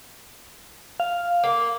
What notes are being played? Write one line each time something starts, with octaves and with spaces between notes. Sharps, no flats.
F5
A#3